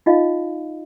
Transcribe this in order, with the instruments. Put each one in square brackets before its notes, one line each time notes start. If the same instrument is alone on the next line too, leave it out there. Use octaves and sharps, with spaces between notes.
[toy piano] D#4 F4 D#5 F5